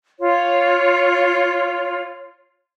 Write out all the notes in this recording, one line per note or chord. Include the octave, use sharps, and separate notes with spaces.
F4 C#5